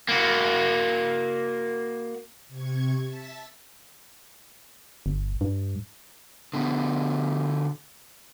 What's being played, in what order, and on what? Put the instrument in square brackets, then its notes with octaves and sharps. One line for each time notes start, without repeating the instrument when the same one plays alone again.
[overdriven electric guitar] A#3 F#4
[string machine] C3 C#6 G#6
E5 A5 A6 B6
[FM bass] G1
G2
[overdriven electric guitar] B2 D3